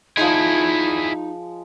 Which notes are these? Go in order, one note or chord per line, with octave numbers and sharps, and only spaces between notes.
F3 G#3 D#4 E4 G#4